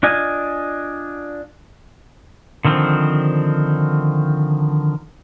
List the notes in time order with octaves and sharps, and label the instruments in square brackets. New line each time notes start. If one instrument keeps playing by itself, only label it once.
[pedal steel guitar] D4 F4 D#5 G#5
D3 D#3 F3 C4